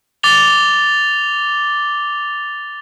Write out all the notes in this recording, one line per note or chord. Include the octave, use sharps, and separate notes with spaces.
D6 A6 F7 G7